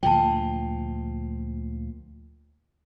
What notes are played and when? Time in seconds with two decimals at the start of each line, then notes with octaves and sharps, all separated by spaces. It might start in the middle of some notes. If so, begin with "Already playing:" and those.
0.03 D2 A#2 F3 G5 A5